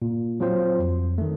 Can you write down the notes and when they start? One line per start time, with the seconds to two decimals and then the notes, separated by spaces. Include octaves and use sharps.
0.02 A#2
0.40 F#3 C4 F4 C5
0.79 F2
1.18 D#3 A3